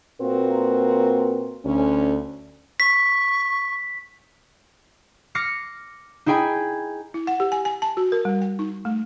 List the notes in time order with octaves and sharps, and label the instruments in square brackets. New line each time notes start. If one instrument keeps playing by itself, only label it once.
[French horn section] A#2 A#3 C4 F#4 A#4 B4
D2 C#4
[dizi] C#6 [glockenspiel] B6
[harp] D6 F6 A#6 C7 C#7
D#4 E4 G#4 G5 G#5 B5
[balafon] E4
F#5
G4
G#5
G#5
A5
F#4
A#4
G3
G5
D#4
A3